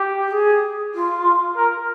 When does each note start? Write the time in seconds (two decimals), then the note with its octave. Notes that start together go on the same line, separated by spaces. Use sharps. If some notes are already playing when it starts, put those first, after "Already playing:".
Already playing: G4
0.27 G4
0.32 G#4
0.94 F4
1.57 A#4